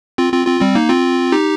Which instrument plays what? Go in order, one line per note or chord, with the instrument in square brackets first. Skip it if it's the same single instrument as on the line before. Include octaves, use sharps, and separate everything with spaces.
[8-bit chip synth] C4 F4
C4 F4
C4 F4
G3 C4
A#3 D#4
C4 F4
D#4 G4